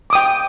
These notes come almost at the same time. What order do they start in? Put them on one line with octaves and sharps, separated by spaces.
D6 D#6 G5